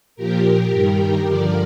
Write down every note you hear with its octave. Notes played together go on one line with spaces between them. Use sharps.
A#2 F3 G4 A#4
G2 D#3 G3
G2 D3 F3 A#4 D5